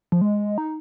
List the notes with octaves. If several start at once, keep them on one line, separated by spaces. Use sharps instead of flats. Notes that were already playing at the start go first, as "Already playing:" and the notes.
F3
G#3
D#4